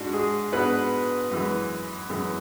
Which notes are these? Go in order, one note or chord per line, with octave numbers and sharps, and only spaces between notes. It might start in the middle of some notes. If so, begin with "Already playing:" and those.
Already playing: G#2 G#3 D4 F#4
G#3 G#4
G#2 G#3 B3 D4 B4
F#2 E3 G#3
F#2 E3 G#3